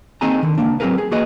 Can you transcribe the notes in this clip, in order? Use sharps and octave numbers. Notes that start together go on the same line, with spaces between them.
A#3 C4 D#4 G#4 G#5 A#5
D3 D#3
C#2 B2 A#3 D4
F#3 C4 D#4 G#4 A#4 B4
G#4
A#3 F#4 G#4 B4 D#5